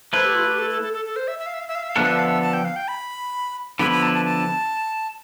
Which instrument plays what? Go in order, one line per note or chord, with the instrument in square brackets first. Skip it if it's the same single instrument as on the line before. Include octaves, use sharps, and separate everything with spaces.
[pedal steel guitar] A3 E4 B4 [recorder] C5
[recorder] G4
F4
G4
A4
A4
A4
A4
A4
C5
E5
E5
F5
E5
F5
E5
F5
E5
F5
[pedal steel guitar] D3 F3 B3 D4 A4 [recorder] E5
[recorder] F5
E5
F5
E5
A5
G5
F5
G5
B5
[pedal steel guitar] D3 F3 B3 E4 B4 [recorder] B5
[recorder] B5
A5
A5
A5